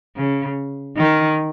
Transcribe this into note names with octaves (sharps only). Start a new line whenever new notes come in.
C#3
D#3